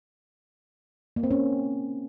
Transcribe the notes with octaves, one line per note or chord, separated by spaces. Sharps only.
A#3
C4
C#4